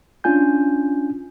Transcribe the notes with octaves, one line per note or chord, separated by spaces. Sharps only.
C#4 D4 F4 G#5 G6